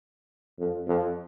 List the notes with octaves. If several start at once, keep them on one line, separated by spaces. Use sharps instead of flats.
F2
F2